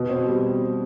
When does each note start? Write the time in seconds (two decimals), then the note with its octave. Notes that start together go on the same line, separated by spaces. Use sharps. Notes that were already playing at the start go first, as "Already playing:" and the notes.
Already playing: B2
0.09 C4
0.26 G3